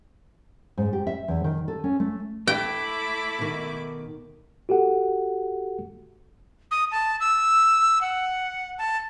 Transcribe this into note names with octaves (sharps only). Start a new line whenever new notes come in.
G#2
G4
E5
E2
D#3
A4
C#4
A3
A3 E4 G5 D6
B2 D#3
F#4 G4 A4 F#5
D#6
A5
E6
F#5
A5